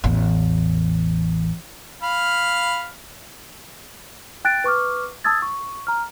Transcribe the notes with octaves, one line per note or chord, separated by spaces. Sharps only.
A1 E2
F5 B5 F6
G5 F#6 A6 D7
B4 C#6 D6 F6
A5 D#6 E6 G#6 A6
C#6
A#5 F6